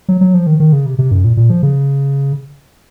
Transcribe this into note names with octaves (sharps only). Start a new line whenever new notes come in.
F#3
F#3
F3
D#3
D#3
C#3
C3
C3
F#2
A#2
A#2
F3
C#3